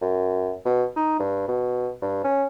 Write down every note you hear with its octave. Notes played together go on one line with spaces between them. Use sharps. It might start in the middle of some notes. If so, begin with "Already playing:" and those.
F#2
B2
D#4
G2
B2
G2
C#4